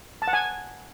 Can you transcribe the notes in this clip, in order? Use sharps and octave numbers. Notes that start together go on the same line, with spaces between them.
A5
F#5
G#5